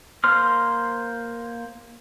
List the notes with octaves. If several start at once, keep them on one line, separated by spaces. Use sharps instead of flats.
A#3 C5 C6 F6